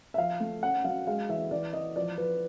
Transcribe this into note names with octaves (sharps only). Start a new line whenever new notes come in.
E5
F3 F5
A3
C#4 F#5
F#3 F5
G#3 F5
E3 E5
E3 D5
E3 D#5
F3 D5
F3 B4